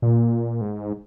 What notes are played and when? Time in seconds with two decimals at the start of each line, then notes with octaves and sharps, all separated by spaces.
0.02 A#2
0.61 G#2